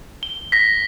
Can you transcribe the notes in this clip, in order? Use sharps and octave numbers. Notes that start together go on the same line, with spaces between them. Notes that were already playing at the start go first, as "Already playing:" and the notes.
G7
A#6 B6